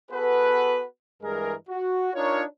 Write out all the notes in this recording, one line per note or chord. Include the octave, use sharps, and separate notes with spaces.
B3 F#4 G#4 A4 B4
G2 E3 G#3 G#4 A#4
F#4
D4 D#4 F4 A#4 C#5